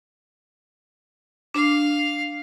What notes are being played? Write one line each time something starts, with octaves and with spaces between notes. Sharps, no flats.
D4 F5